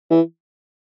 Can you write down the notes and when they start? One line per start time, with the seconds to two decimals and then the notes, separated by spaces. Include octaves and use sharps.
0.10 E3